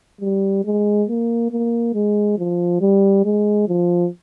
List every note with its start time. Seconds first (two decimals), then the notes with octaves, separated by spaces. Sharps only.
0.21 G3
0.65 G#3
1.09 A#3
1.51 A#3
1.95 G#3
2.38 F3
2.81 G3
3.25 G#3
3.68 F3